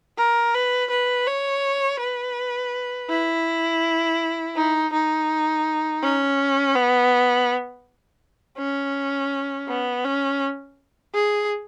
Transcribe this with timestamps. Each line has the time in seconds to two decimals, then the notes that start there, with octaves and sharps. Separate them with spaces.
0.18 A#4
0.54 B4
0.90 B4
1.27 C#5
2.00 B4
3.10 E4
4.56 D#4
4.93 D#4
6.03 C#4
6.75 B3
8.58 C#4
9.68 B3
10.04 C#4
11.14 G#4